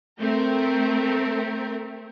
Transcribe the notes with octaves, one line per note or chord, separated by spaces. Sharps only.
A3 C4 A#4